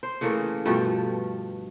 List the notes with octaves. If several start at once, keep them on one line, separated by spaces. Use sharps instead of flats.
C5
C#3 E3 A3 A#3
G2 B2 F3 A3